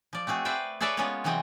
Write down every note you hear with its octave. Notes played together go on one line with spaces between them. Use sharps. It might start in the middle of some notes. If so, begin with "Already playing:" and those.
F3 D5
A3 C4 F#4 G#4
B4 C5 D5 E5 G5
G#4 A4 B4 C#5 D5 E5
G#3 A#3 B3 C#4 F4 C#5
C3 E3 F#3 G#3 D#5 G5